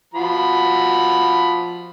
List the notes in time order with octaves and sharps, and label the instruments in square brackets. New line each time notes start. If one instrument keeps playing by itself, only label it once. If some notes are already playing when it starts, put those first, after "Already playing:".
[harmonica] F3 F#4 B5